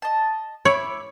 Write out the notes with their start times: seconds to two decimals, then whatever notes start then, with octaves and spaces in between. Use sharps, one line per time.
0.02 D#5 A5
0.65 E4 C#5 B5 D6